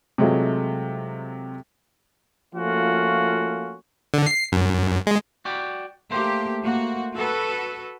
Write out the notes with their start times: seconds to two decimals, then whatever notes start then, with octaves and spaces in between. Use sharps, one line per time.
0.18 C3 F#3 G#3 A3 F4
2.54 F3 A3 A#3 C#4 F4 F#4
4.14 D3
4.27 C7
4.52 F#2
5.07 G#3
5.45 F#4 D5 G5
6.11 A3 A#3 G4 C5
6.62 A#3 F#4
7.15 F#4 A4 B4